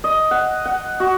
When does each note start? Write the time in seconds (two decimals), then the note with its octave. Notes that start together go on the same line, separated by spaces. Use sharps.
0.04 D#5
0.31 F#5
0.65 F#5
1.00 F#4